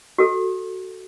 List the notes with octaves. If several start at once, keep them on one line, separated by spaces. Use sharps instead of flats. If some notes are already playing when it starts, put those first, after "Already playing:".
F#4 A4